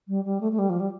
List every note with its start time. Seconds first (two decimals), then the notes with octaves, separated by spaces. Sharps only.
0.08 G3
0.24 G3
0.41 A3
0.52 A3
0.59 G3
0.70 F3
0.80 G3